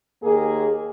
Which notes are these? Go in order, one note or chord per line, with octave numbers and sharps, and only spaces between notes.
D#2 A#3 G#4